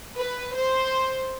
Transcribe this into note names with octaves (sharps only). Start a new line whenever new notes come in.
B4
C5